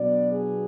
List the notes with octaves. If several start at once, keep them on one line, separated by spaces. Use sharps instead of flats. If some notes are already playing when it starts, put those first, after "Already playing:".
Already playing: B2 F#3 B3 D4 D5
G#4